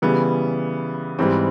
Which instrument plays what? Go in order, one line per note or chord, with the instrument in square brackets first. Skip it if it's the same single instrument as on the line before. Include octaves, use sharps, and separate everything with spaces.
[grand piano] C#3 E3 G3 [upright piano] B3
[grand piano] G#2 E3 G3 [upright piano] C4